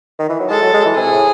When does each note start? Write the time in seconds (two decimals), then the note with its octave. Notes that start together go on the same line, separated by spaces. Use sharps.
0.19 D#3
0.29 E3
0.40 F#3
0.50 G#3 A4
0.62 F#3
0.74 G#3
0.85 E3
0.96 C3 G#4
1.12 A2